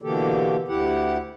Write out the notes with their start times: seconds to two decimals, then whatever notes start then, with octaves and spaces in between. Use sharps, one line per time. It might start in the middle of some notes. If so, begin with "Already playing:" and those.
0.02 B2 D3 E3 A#3 G4 A4
0.68 D2 E4 G4 F#5